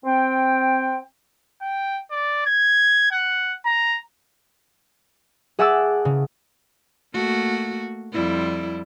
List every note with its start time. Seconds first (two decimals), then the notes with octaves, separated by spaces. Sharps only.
0.05 C4 G5
1.62 G5
2.11 D5
2.46 G#6
3.11 F#5
3.65 A#5
5.59 G#4 E5 F#5 A5 D6 E6
6.05 C#3
7.13 A3 A#3 F#4
8.12 F2 G3 E4